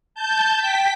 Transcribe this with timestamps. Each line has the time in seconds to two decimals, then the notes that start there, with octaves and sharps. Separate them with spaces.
0.15 A5 G6
0.58 G5 B6